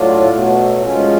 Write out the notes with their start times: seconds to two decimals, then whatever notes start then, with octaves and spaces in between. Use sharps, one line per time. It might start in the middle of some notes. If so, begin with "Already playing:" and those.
Already playing: A2 F#3 A3 D4 F4
0.31 B2 F#3 A3
0.81 G#2 F3 G#3 C#4 F4